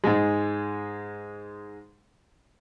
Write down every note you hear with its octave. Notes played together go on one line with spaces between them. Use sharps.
G#2 G#3